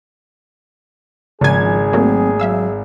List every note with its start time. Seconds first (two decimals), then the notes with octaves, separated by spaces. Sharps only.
1.41 G#1 C#3 F3 G#4 G#5 G#6
1.93 F#3 A3 A#3 C4
2.40 F#3 E5 F5 E6